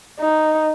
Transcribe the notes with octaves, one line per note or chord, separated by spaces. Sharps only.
D#4